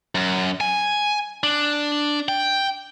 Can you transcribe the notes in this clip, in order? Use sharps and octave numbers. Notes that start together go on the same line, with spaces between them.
F#2
G#5
D4
G5